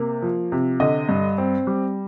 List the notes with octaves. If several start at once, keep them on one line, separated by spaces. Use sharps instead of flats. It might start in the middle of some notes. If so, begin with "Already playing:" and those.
Already playing: C3 A#3
F3
C3
D3 D#5
G2
C4
G3